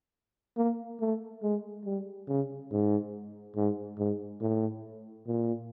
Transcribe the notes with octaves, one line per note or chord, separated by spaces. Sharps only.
A#3
A3
G#3
G3
C#3
G#2
G#2
G#2
A2
A#2